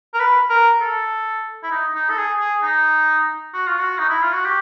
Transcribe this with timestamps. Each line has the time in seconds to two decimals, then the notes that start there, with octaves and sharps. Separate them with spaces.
0.14 A#4
0.19 B4
0.49 A#4
0.81 A4
1.63 E4
1.71 D#4
1.95 D#4
2.10 A4
2.18 G#4
2.40 G#4
2.62 D#4
3.54 F#4
3.67 F4
3.79 F#4
3.99 D#4
4.10 E4
4.22 F4
4.33 F#4
4.45 G4